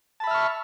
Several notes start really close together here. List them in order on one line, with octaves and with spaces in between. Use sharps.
A5 B5 E5 F6 C#6